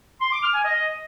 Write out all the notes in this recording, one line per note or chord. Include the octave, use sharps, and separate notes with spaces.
C6
D6
F6
G#5
D#5